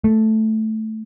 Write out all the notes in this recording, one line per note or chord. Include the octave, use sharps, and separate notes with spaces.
A3